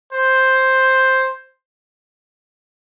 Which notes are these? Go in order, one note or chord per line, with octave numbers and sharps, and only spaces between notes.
C5